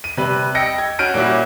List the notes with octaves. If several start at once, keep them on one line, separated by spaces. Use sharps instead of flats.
D#7
C3 G3 B4
D#5 G5 E6 A#6 C#7
G#6
C#4 F#4 F6 G6 D7 D#7
A#2 G3 C#4 E4 F#4